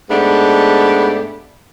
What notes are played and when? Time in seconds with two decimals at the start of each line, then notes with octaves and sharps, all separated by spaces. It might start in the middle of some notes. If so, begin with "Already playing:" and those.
0.10 G#2 A3 B3 D4 G4